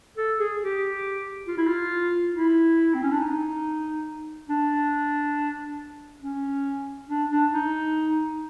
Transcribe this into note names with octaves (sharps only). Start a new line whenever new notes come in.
A4
G#4
G4
F4
E4
F4
E4
C4
C#4
D4
D#4
D4
C#4
D4
D4
D#4